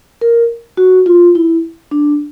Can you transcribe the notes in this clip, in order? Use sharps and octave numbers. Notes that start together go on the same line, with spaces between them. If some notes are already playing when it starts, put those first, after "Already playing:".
A#4
F#4
F4
E4
D4